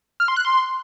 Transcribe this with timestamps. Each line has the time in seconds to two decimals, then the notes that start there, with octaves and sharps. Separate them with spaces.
0.20 F6
0.28 C6
0.36 F#6
0.45 C6